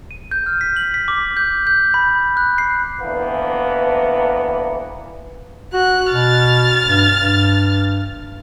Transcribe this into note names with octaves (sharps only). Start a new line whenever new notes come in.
D#7
G6
F6
B6
F#7
B6
D6
G6
G6
B5
F#6
C7
D2 E3 A#3 B3
F#4 F#6
B2 F6 A6
G2
G2